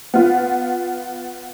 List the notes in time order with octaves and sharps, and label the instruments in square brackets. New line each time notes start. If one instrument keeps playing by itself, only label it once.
[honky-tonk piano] B3 F4